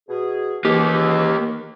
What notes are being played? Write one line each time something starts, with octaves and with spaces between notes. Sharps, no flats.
B2 G#4
C#2 E3 A#3 D#4 G4